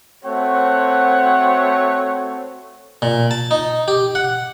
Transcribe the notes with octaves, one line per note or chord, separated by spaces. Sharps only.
A3 C4 F#4 C5 C#5 F#5
A#2
A5
D#4
G4
F#5